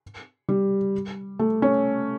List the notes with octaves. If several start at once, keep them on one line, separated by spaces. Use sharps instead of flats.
G3
A3
C#4